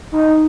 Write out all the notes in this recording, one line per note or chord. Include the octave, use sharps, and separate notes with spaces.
D#4